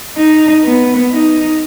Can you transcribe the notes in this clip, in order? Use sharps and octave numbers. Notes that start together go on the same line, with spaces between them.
D#4
B3
D#4